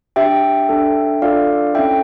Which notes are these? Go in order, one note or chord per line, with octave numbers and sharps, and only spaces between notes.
D4 G4 E5 G5
D4 A4
D4 F4 A4 D5 F5
C#4 E4 A4 E5 G5